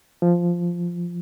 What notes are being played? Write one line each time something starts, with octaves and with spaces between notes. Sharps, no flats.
F3